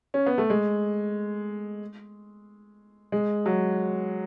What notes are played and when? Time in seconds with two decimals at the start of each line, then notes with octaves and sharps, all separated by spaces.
0.14 C#4
0.27 B3
0.38 A3
0.50 G#3
3.12 G#3
3.46 F#3